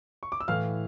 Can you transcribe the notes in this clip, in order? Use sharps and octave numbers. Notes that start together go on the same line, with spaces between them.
C#6
D6
E6
A2 E3 F5 F6